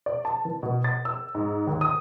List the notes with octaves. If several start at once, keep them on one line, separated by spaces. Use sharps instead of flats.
D5
A5
E3
B2
A6
E6
G#2
D#2
D#6